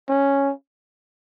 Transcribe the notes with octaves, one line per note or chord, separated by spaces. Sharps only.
C#4